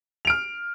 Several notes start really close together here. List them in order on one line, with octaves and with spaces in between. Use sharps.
F7 D7 F6